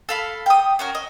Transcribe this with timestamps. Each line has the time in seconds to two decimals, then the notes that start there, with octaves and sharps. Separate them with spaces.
0.09 A4 F5 B5
0.46 G5 D#6
0.79 C#4 F#4 A#4
0.95 D#5